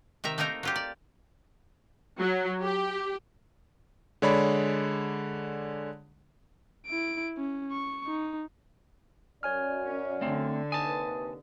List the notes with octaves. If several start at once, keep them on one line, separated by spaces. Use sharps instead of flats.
C3 D#3 E5 A#5
A3 A#3 C4 D#4 A#4 A#5
F#3 F4 G4
D5
F#3
G4
D3 G#3 C#5 D5 B5
E4 D7
C#4
C#6
D#4
F#2 C#5 D5 G#5 F6
C#4
D3 A3 C4
D#2 C3 B4 G#5 A5 D#6